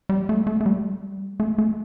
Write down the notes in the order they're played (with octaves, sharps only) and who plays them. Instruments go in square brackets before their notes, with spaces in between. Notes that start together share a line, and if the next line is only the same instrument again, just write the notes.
[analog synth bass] G3
A3
A3
A3
G3
A3
A3